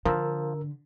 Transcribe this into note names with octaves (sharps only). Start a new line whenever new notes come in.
D3 F3 A#4 E6